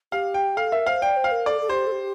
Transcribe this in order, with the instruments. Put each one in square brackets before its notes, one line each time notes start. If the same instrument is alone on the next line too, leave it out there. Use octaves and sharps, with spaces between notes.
[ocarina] G4 [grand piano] F5
[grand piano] G5
[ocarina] A4 [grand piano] F5
[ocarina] A#4 [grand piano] E5
[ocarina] C5 [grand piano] F5
[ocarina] D5 [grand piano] G5
[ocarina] C5
[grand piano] F5
[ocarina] A#4
[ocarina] A4 [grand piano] D5
[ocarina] A4
[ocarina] G4 [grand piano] C5
[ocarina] A4
G4